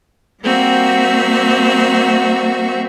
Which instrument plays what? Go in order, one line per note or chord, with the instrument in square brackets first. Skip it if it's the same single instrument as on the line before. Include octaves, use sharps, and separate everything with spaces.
[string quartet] G3 A#3 C4 F#4 E5